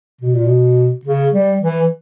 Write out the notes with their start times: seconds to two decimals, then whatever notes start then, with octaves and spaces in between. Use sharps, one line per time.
0.21 B2
0.34 A#2
0.46 B2
1.05 C#3
1.33 G3
1.61 E3